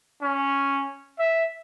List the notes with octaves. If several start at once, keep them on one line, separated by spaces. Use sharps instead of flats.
C#4
E5